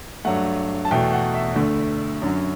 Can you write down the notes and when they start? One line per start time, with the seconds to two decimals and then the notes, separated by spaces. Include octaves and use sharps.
0.25 G2 F#3 A3 F#5
0.85 A5
0.91 E2 B2 A3 G5
1.13 F#5
1.34 E5
1.56 D2 D3 A3
2.22 F#2 D3 F#3